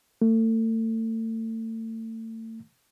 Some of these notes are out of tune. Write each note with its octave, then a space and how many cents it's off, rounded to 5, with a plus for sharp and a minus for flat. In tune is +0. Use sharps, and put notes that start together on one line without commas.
A3 +35